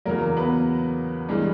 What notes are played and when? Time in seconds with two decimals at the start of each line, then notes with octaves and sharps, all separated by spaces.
0.05 E2 C#3 F#3 A#3 A#4
0.37 B3 B4
1.29 G2 E3 G#3